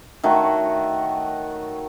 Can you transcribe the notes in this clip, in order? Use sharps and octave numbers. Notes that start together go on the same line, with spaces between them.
D#3 A3 F#4 C#5